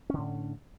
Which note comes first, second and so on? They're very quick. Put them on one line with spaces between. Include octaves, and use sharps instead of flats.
C#4 D3 A2